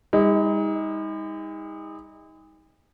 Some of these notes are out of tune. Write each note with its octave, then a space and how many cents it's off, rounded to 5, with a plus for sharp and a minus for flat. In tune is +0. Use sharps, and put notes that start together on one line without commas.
G#3 -45 D#4 +30